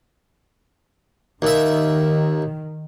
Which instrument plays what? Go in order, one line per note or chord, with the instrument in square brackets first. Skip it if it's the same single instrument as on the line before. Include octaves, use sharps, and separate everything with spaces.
[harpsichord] D#2 E5 [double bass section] D#3